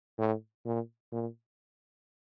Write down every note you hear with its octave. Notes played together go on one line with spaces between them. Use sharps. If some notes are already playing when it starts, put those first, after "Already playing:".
A2
A#2
A#2